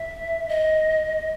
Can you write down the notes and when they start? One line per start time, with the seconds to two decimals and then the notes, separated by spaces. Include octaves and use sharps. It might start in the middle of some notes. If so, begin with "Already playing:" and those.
Already playing: E5
0.49 D#5